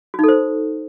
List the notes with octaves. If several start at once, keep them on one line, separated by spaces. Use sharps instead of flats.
D#4 F#4 A4 C5